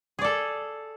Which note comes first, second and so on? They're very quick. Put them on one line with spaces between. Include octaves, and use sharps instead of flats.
G#4 D5 A4